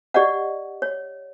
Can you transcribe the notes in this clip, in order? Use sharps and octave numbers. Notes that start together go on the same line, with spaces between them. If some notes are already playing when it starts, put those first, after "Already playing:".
G4 D5 D#5 F#5
C#5